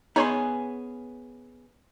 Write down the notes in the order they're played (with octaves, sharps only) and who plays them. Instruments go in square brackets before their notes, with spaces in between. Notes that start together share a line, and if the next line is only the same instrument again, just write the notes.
[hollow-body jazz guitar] B3 C#4 G#4 [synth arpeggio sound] D#4 C#5 C6